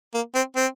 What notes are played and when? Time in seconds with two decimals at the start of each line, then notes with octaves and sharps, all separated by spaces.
0.14 A#3
0.35 C4
0.56 C4